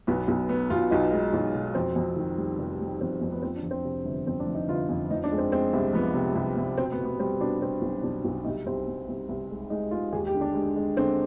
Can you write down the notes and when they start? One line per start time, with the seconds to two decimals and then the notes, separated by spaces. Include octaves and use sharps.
0.07 B1 B3
0.28 B1
0.49 B2 B3
0.70 B1 F4
0.91 B1 D#4
1.12 G#3
1.33 B1
1.55 B2
1.75 F2 C4
1.96 F2
2.17 D#3
2.37 G3
2.59 F1
2.81 G3
3.01 F2 C4
3.22 F2
3.32 B3
3.42 F3 C4
3.56 D4
3.63 F2
3.71 C4
3.84 C3
4.05 G1
4.27 F2 C4
4.40 D4
4.47 F3
4.55 D#4
4.68 G1 F4
4.89 F2
5.11 F3 D#4
5.24 D4
5.32 G#3
5.38 C4
5.52 G#3 C4
5.73 C2
5.93 F3 B3
6.14 C3
6.35 C2
6.57 C2
6.78 B2 C4
6.92 B3
6.98 B2
7.05 B3
7.19 G3 C4
7.40 B2 D4
7.61 B2 C4
7.82 B1
8.03 B1 D4
8.25 B1
8.45 C2 D#4
8.66 C2 C4
8.88 C2
9.09 C2
9.29 C2
9.50 G#3
9.70 G#3 D#4
9.91 G#3 F4
10.13 D#2 G#4
10.27 G4
10.34 D3
10.41 D4
10.54 G#3
10.76 G#3
10.97 D3 C4